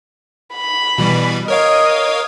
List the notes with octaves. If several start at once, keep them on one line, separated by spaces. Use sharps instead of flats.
B5
B2 E3 G3
A#4 C#5 D#5 F5